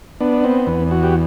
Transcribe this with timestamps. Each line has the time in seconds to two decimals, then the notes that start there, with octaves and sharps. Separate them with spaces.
0.20 B3 D4
0.44 C4
0.67 E2
0.91 F#4
1.03 G4